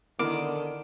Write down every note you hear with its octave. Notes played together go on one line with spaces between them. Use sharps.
D3 D#3 B3 E4 A#4 D6